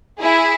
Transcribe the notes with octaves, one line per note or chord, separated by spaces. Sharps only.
E4 G#4